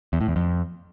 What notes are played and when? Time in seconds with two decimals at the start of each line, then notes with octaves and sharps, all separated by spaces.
0.13 E2
0.21 A2
0.28 E2
0.36 F2